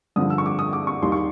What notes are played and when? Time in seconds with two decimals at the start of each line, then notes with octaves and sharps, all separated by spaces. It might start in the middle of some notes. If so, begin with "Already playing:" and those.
0.16 G2 D3 F3 D#6
0.30 E6
0.38 C#6
0.46 D6
0.59 D#6
0.73 D6
0.87 C#6
1.02 D#2 D#3 G3 C6
1.12 C#6